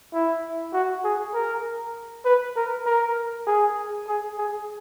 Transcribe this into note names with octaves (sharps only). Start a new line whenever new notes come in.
E4
F#4
G#4
A#4
B4
A#4
A#4
G#4
G#4
G#4